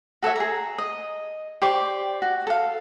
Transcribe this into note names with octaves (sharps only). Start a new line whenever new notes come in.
F#4 A4 C#5 E5
G#4 A#5
D#5
G4 C5 D5 C#6
F#4
A4 F5